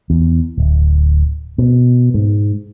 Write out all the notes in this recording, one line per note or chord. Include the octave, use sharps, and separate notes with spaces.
E2
D1
B2
G#2